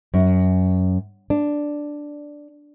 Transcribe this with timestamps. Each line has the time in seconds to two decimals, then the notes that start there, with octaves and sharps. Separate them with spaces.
0.14 F#2
1.30 D4